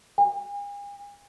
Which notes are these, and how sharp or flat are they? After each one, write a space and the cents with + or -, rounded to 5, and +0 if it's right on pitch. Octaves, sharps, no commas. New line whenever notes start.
G#5 -45